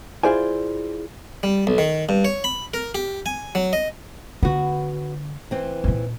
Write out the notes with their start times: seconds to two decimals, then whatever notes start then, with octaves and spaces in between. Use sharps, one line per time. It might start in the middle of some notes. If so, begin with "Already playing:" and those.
0.23 E4 F4 G#4 C5 D5 G#5
1.43 G3
1.67 B1
1.78 D#3
2.09 G2
2.25 C#5
2.44 B5
2.74 A#4
2.95 G4
3.26 G#5
3.55 F#3
3.73 D#5
4.43 D3 B3 F#4
5.51 E3 C4
5.84 A#2 D#3